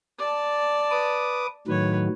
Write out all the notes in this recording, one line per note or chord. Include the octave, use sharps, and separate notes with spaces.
D5 A5
B4 D6 D#6
A2 D#3 F#3 B4 C#5